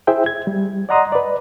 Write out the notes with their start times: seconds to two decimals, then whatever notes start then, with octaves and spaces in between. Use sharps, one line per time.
0.07 E4 G#4 C5 E5 G5
0.26 G#6
0.47 G3
0.89 D5 D#5 F#5 A#5 C6 D#6
1.12 B4 D5